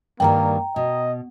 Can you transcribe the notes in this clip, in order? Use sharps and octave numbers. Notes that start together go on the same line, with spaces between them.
G2 D#3 G3 A#3 G5 A#5
B2 D#5